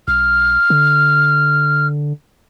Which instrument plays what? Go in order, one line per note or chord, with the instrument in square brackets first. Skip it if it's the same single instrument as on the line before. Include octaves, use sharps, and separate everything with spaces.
[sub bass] B1 [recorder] F6
[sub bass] D3